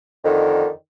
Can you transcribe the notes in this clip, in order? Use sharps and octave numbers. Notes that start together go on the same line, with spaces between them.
F2 D3 D#3